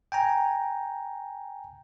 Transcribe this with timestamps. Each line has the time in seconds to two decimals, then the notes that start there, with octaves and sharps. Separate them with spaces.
0.12 G5 G#5 A#5